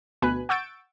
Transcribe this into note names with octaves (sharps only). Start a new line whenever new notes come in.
D2 B2 B4 G#5 B5 F#6
F#5 C#6 E6 G6 A6 D7